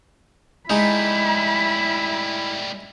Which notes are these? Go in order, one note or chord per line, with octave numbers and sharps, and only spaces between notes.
A2 G3 G#3 D#4 E4 B5